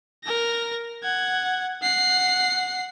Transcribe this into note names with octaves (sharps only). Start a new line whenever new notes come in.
A#4 A#6
F#5 G#6
F#5 C7